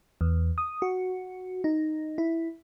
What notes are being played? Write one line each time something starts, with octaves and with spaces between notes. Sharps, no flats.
E2
D#6
F#4
D#4
E4